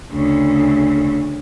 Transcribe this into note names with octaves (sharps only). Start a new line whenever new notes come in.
D2 C#3